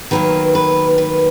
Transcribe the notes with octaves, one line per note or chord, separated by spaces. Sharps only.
D#3 F#3 A#3 B4
B4
B4